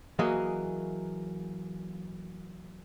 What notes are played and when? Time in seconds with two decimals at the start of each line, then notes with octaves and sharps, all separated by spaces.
0.19 E3 F#3 A#3 G#4 D#5